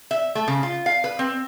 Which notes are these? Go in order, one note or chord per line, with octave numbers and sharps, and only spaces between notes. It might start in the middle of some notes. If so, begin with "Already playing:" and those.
E5
A3
C#3
F4
F5
B4
C4